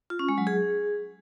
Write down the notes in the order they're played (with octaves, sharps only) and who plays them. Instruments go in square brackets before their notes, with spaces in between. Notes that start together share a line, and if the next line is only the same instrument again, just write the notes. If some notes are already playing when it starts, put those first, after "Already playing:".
[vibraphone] F4
C#4
G#3
F#3
G#4